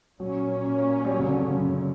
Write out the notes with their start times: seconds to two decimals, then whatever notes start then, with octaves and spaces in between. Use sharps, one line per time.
0.19 A#2 F#3 A#3 C#4
1.05 G3
1.11 F#3
1.20 C#3
1.26 D3
1.41 C#3
1.56 F#2